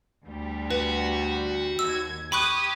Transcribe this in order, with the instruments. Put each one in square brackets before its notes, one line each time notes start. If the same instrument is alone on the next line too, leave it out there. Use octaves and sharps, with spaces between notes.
[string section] D2 G3
[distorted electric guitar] F#4 [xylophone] B4
[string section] D#2 G#6 [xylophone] E6
[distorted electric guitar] G4 [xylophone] B5 C#6 F#6 [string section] D#6 G#6